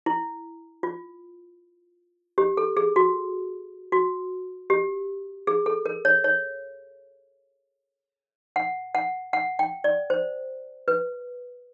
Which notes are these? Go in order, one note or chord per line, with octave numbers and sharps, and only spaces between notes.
E4
F4
G4
A4
G#4
F#4
F#4
G4
G#4
A4
A#4
C#5
C#5
F#5
F#5
F#5
G5
D5
C5
B4